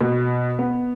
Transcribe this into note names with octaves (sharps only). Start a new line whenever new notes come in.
B2
B3